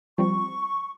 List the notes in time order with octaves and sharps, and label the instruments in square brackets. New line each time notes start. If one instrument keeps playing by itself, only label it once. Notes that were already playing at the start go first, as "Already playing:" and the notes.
[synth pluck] F3 G3 C4 [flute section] C#6